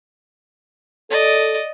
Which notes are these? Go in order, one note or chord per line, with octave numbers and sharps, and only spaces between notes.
A4 D5 D#5